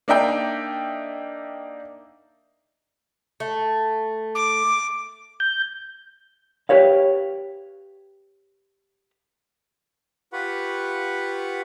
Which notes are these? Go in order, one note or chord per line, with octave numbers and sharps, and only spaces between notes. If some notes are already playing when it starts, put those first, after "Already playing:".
A#3 D4 D#4 E5 G5
A3
D6
G6
G4 B4 C#5 F5
F4 G4 B4 F#5 B5 C#6